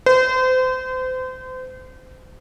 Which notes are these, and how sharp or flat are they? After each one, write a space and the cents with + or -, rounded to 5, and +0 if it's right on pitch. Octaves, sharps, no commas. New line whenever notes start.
C5 -35